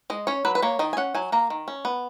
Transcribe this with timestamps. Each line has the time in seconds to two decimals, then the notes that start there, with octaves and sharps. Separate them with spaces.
0.10 G#3 D#5
0.27 C#4 C#5
0.45 F#3 B4
0.55 B4
0.62 A#3 C#5
0.79 D#3 D#5
0.93 G#5
0.97 C#4 F#5
1.15 F#3 G#5
1.32 A#3 A#5
1.50 D#3
1.68 C#4
1.85 B3